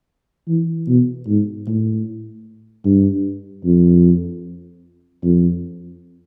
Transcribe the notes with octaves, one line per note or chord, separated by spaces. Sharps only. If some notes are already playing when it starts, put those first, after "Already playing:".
E3
B2
G#2
A2
G2
F2
F2